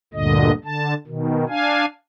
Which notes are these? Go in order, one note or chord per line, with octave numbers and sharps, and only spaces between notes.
D2 G2 A#2 D3 D#5
D3 A5
B2 D#3
D4 F5 G#5